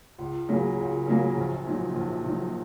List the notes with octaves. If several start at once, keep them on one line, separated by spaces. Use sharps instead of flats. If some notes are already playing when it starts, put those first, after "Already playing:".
C#2
C#3 F#3 A#3
C#2
C#3 F#3 A#3
A#1
A#2 F#3 D#4
A#1
A#2 F#3 D#4